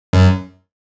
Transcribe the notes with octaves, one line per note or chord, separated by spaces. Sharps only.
F#2